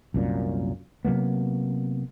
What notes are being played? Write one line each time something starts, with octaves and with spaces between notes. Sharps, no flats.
C2 F#2 A#2
C3 F#3 A#3 B3